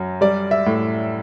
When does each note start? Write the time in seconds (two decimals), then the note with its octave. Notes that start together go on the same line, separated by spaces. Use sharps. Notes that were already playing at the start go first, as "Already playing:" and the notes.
Already playing: F#2 F#3
0.21 G3 D5
0.51 E5
0.66 A2